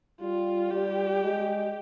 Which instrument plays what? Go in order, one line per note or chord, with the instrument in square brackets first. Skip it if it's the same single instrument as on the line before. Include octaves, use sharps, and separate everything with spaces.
[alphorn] G3 [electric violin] F4
[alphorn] G3 [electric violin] G4
[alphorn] G#3